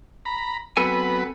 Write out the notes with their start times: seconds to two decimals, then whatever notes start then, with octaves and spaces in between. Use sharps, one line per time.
0.25 A#5 B5
0.77 F#3 B3 C4 A4 B4 G#5